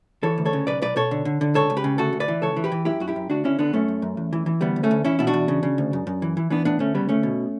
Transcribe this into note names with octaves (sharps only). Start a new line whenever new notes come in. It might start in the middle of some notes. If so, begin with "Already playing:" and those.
E3 A4 C#5
D2
A4 C#5
C#3
B1 B4 D5
B1 B4 D5
B2 A4 C#5
D3
D3
D3
C#2 A4 C#5
C#2
G4 B4
C#3
D2 F#4 A4
D2
B4 D5
E3
C#2 A4 C#5
E3
G4 B4
E3
F#2 E4 G4
F#2 F#4
E4 G4
F#2
D2 D4 F#4
D3 C#4 E4
D3 B3 D4
F#2 A3 C#4
F#2
F#2
E2
E3
E3
D2 G3 B3
D2
A3 C#4
D2
E2 C#4 E4
B2 E4
D4 F#4
E2
C#3
C#3
D2
F#2
F#2
E3
E3
E3 B3 D4
A2 B3 D4
D2 A3 C#4
C#3 G3 B3
D2 A3 C#4
B2